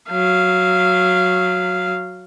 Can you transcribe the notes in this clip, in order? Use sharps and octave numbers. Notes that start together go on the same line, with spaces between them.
F#3 F5